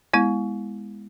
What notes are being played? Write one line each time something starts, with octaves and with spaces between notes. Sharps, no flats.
G#3 B3 E4